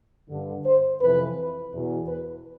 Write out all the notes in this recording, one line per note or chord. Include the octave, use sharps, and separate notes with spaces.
G2 D3
C5
F2 C3 E3 B4
E2 B2
B4